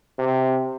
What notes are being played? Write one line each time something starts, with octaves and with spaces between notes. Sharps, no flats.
C3